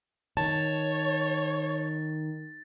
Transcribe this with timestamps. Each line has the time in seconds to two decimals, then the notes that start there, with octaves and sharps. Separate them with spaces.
0.37 D#3 C#5 A5 A6